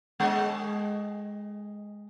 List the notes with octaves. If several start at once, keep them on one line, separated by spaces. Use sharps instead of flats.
G#3 D#5